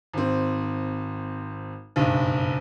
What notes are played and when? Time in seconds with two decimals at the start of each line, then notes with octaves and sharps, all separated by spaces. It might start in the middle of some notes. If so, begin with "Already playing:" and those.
0.13 G#1 C4
1.96 F#1 B1 G2